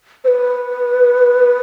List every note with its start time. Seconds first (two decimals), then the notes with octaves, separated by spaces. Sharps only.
0.24 C5
0.28 B4